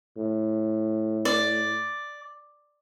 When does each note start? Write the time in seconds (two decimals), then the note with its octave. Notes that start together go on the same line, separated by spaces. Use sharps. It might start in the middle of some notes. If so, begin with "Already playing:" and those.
0.17 A2
1.25 D5